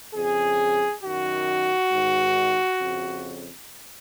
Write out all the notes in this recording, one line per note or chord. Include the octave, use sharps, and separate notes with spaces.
F2 C#3 G#4
F#2 D#3 F#4
G#2 D#3
F2 C#3